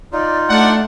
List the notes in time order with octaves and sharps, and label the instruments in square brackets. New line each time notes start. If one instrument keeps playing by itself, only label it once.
[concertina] D#4 F4 [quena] D5
[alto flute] A3 [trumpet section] D4 F#5 [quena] D5